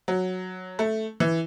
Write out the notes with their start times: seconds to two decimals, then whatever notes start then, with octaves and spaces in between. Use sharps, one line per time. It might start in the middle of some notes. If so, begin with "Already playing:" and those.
0.08 F#3
0.79 A3
1.20 E3